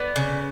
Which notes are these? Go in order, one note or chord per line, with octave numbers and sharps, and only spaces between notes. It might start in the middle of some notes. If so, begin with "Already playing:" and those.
Already playing: B3 D5
C#3